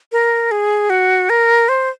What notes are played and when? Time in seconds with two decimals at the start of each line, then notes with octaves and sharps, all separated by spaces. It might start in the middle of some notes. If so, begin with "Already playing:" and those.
0.12 A#4
0.51 G#4
0.90 F#4
1.30 A#4
1.69 C5